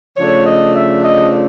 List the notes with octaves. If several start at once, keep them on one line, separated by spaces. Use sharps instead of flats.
C#3 F3 A3 D4 C#5
D#5
E5
D#5